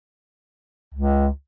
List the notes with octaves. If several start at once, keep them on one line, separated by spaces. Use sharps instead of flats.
C#2